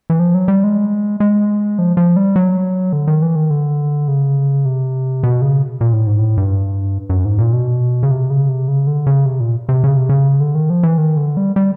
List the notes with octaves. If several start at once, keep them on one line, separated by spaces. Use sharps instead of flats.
E3
F3
F#3
G3
G#3
G#3
F3
F3
G3
F#3
D3
D#3
E3
D#3
D3
C#3
C3
B2
C#3
A#2
A2
G#2
A2
G2
F#2
G#2
A#2
B2
C#3
C3
C#3
C3
C#3
D3
C#3
C3
A#2
C3
C#3
C3
C#3
D3
D#3
F3
E3
D#3
D3
G3
G3